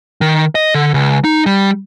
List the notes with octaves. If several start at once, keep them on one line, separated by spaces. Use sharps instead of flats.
D#3
D#5
D3
C#2
D#4
G3